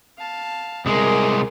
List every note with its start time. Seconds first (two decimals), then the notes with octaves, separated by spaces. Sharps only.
0.18 F5 A5
0.86 C2 G#3 G#4 A#4